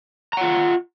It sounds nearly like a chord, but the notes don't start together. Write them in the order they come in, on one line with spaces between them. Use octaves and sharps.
A#5 F#5 F4